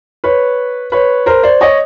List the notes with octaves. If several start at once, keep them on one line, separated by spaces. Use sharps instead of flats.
B4 C#5
B4 C#5
A#4 C5
C5 D5
C#5 D#5